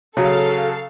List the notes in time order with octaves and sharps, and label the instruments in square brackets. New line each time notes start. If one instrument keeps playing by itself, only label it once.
[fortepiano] C#3 F#3 [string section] A4 F5